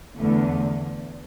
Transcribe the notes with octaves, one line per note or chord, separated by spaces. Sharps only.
E2 D3 A3